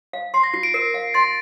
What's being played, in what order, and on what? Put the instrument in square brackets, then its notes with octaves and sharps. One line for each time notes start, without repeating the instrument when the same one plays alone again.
[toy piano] F5
[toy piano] C6 [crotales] C7
[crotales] A#6
[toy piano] F4 [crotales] C7
[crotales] D7
[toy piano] A#4 [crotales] C7
[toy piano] F5
[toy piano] C6 [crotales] A6